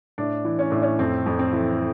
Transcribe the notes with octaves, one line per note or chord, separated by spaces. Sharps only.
A2 D4
E3
C#4
A2 D4
C#4
F2 C4
F2
C4
E3